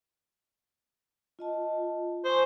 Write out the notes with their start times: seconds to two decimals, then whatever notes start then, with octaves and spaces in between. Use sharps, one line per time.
1.39 F4 D#5 A5
2.25 C5 G#5 C#6 D#6